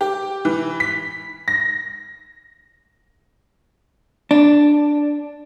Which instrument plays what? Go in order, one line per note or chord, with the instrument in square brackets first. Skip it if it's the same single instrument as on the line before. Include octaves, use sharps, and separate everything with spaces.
[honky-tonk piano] G4
E3
B6
A#6
[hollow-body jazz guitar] D4